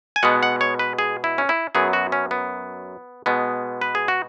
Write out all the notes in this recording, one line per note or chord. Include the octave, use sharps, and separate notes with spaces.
G#5
B2 G#3 B3 F#5
F#5
C#5
B4
G#4
E4
C#4
E4
F#2 F#3 B3 G#4
F#4
C#4
B3
B2 G#3 B3
B4
G#4
F#4